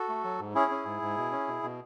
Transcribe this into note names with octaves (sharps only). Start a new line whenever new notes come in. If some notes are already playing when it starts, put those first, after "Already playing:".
Already playing: F#4 A4
A3
F#3
G#2
C#4 E4 G#4
C#4
G#2
G#2
B2
C#4
B2
B2